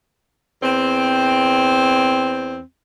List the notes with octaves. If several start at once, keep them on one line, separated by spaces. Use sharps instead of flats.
E2 C4